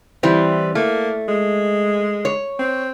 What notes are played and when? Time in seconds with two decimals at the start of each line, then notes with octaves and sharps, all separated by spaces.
0.23 E3 G3 C4 B4
0.75 A3 A#3
1.28 G#3
2.25 C#5
2.59 C4